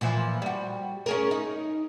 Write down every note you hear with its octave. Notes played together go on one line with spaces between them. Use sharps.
A#2 E3 F3
G3 F#4
C#4 G#4 A#4
D#4